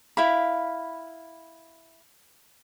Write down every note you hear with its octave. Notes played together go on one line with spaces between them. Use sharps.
E4 F5 B5